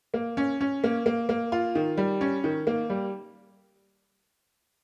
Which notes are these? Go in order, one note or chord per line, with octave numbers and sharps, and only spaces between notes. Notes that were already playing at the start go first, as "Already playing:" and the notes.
A#3
C#4
C#4
A#3
A#3
A#3
F4
D#3
G3
C#4
D#3
A#3
G3